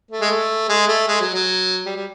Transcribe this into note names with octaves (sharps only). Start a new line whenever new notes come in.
A3
G#3
A3
G#3
A3
G#3
F#3
F#3
G3
G3